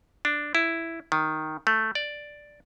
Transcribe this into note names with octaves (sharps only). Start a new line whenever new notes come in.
D4
E4
D#3
A3
D5